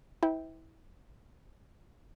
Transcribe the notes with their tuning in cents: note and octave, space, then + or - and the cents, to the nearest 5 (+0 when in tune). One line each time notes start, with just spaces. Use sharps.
E4 -30 B4 +40 G5 +0